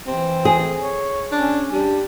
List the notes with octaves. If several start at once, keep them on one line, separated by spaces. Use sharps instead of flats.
E3 C4
G#4
C#5
C#4 D4
G3 D4